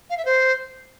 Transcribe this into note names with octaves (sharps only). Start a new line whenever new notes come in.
F5
E5
C5